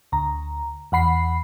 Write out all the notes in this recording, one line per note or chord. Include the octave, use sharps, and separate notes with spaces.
D2 A#5
E2 F#5 B5 C7